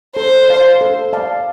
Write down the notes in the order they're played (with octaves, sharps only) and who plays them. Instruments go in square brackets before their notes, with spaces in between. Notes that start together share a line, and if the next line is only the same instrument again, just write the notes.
[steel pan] A4 [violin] C5
[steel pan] D5 F5 A5
A4
D5 F5 A5